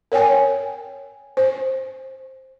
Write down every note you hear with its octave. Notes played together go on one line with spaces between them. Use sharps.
A#4 C#5 G5 G#5
C5